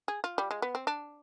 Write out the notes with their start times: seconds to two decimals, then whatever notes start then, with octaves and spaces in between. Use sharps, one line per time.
0.08 G#4
0.24 F4
0.38 G3
0.51 G#3
0.62 B3
0.75 C4
0.87 D4